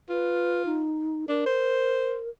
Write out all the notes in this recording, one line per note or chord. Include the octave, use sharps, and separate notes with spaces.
F4 B4
D#4
D4 A#4
C5